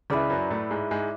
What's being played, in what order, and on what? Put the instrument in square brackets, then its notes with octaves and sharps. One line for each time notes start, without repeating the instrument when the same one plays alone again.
[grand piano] C#2 C#3 [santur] E4 B4 D5
[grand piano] F#2 F#3
A2 A3
G#2 G#3
G#2 G#3